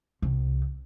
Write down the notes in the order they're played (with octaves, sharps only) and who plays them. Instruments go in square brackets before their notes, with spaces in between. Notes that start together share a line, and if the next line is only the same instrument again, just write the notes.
[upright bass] C2